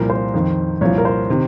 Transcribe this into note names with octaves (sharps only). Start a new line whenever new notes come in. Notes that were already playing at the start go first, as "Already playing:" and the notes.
Already playing: C2 A#2 F3 A#4
C5
F2 D#3
C2 A#2 F3 C#5
A#4
C5
C3 D#3